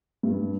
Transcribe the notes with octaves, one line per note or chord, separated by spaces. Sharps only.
G2